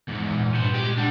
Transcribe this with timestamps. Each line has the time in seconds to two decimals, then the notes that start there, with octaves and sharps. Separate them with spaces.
0.08 E2 G#2
0.32 A#2
0.54 C#2 G2 B3 C5
0.74 C2 G#3 G4
0.97 G3 D4 F#5